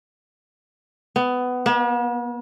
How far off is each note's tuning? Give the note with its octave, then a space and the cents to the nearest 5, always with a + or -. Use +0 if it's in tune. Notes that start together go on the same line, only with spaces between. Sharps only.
B3 +15
B3 -45